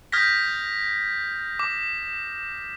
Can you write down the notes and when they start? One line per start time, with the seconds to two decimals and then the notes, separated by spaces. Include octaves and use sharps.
0.12 D#6 F6 G6 G#6 A#6 B6
1.59 D6